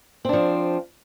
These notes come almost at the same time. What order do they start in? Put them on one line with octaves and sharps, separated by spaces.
C4 D4 F3